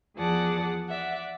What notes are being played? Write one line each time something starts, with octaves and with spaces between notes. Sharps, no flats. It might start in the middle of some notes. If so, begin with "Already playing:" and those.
E2 F3 G#4 D5 F#5 A5
D5 E5 F#5